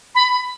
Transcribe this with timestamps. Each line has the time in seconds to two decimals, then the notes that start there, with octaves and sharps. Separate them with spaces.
0.15 B5